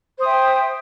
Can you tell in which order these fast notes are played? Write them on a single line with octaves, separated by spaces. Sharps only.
C5 D#6 E5 G5